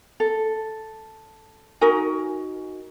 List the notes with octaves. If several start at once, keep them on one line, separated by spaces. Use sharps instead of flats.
A4
D#4 F#4 A#4 G#5